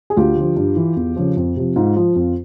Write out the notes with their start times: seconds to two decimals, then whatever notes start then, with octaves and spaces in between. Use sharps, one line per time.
0.10 G#4
0.17 D2 F4 G4
0.37 D3 F3
0.57 G2
0.76 E3
0.97 E2
1.16 C#3 F3
1.36 F2
1.56 C3 F3
1.76 G#2 F4
1.96 F3
2.16 F2